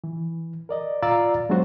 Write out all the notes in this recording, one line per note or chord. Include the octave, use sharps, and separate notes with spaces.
E3
A#4 D5 D#5
F4 D5 F5 A#5 E6 A6
F#3 G#3 B3 D4 F#4 C5